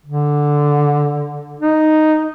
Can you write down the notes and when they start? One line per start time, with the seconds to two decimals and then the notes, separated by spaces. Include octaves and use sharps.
0.06 D3
1.60 D#4